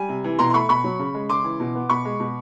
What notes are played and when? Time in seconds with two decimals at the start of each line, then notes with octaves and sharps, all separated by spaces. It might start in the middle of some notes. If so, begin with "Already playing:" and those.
Already playing: G3 G#5
0.09 C3
0.24 E3
0.39 B2 A#5 C6
0.50 C6
0.54 A3 B5 C#6
0.69 B2 B5 C#6
0.84 F#3
0.99 C#3
1.14 G#3
1.29 C#3 C6 D6
1.44 E3
1.60 B2
1.75 B3
1.89 B2 B5 C#6
2.05 G#3
2.20 B2